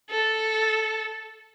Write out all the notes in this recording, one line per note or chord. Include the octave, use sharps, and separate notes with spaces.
A4